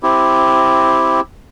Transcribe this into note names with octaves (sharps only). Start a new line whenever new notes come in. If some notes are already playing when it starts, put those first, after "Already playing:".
C4 E4 G4